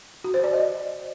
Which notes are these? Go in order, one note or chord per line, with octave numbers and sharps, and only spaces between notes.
F#4
C5
D5
D#5